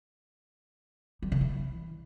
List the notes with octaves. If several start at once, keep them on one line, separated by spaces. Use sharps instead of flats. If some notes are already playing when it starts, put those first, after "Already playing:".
G3
C#3
E3